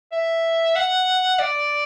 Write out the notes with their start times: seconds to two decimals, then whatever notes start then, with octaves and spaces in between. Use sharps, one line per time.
0.12 E5
0.76 F#5
1.39 D5